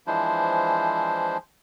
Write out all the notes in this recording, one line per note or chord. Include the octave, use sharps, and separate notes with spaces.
E3 F3 G#3 D4 E4 C5